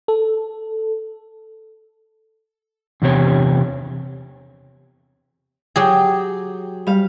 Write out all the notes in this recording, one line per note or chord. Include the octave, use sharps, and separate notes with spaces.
A4
E2 C3 G4 C#5
F#3 G4 G#4
G3 F5